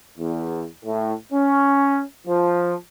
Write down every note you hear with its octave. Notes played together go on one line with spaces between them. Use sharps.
E2
A2
C#4
F3